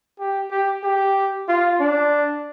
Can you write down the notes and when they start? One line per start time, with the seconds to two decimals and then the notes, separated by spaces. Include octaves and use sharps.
0.19 G4
0.51 G4
0.84 G4
1.49 F4
1.80 D4